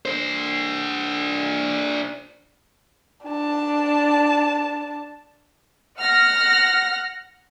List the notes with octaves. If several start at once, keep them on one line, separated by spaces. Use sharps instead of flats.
D4 C5
D4 A5
F#5 F6 A#6